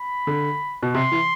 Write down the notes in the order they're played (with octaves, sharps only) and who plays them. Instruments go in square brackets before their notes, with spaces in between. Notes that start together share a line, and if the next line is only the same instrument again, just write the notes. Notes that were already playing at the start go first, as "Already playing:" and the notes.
Already playing: [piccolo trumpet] B5
[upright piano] D3
B2
[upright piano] C3 [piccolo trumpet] C6
[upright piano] E3